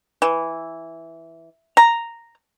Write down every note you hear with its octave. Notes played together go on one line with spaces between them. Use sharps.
E3
A#5